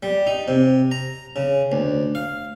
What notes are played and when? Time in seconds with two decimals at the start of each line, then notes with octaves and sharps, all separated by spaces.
0.03 G3
0.27 D#4
0.48 C3
0.91 A#5
1.36 C#3
1.72 D2
2.15 F5